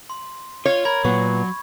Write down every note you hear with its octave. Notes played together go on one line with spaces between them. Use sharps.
C6
F4 C#5
A#4 B5 G#6
A#2 F#3 B3 C#6